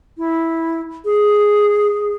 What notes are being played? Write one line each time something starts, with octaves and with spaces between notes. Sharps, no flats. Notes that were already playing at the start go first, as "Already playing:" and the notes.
E4
G#4